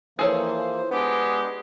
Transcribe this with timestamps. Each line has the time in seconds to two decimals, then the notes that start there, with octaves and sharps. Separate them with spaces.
0.19 E3 F3 A#3 G#4 A4 C5 C#5
0.91 G#3 B3 D4 G4